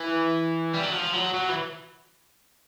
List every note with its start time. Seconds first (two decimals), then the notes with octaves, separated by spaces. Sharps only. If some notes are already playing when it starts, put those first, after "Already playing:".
Already playing: E3
0.74 G3
0.83 F#3
0.93 F3
1.14 F#3
1.34 F#3
1.50 E3